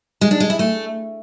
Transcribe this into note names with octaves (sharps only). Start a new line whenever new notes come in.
G#3
D4
G#3
E4
A3